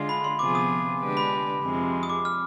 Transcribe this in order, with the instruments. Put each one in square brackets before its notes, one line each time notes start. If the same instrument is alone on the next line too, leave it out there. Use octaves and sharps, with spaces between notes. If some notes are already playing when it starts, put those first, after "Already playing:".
Already playing: [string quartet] D3 G#3 D4 F4
[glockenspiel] B5
C6
[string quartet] C3 F3 B3 F4 G#4 [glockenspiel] D6
[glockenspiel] D#6
[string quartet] D3 G#3 D4 G4 B4
[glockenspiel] B5
[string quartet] F2 C3 F3 G#3
[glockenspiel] D#6
D6
F6